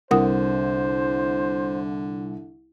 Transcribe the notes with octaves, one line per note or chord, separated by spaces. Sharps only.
C2 D3 A#4 C5 F#5 D#6